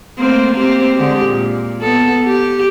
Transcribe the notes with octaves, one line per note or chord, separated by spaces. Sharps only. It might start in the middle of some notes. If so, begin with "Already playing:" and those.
A3 A#3 C4
A#3 C4 G4
D3 G#3 G4
A#2
B3 A4
G4